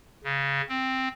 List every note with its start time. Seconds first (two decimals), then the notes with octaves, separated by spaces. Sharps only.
0.24 C#3
0.69 C4